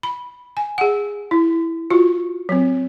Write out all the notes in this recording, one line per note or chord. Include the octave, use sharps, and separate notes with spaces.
B5
G#5
G#4 F#5
E4
F4 F#4
F#3 C4